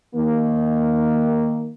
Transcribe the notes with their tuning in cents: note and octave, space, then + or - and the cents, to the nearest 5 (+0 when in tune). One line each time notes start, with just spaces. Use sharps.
D#3 +0 A#3 +0